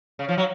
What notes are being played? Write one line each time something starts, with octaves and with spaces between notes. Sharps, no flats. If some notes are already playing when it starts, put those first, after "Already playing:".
C#3
F3
F#3